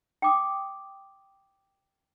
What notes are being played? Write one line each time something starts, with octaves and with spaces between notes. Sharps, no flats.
G5 D6 D#6